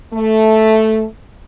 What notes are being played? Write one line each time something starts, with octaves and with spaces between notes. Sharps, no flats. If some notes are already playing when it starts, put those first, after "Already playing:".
A3